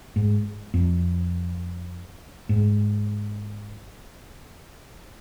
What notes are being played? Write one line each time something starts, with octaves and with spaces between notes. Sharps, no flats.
G#2
F2
G#2